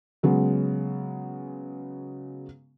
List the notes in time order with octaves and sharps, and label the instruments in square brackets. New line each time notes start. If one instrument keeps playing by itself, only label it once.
[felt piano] C#3 F#3 G#3 B3